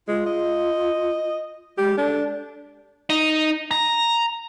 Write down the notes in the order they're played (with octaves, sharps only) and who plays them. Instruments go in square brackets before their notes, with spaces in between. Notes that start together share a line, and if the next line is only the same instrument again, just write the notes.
[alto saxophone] G#3 [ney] F4
[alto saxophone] D#5
[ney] G#3 [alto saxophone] G4
[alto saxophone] D4 [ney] A4
[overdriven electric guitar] D#4
A#5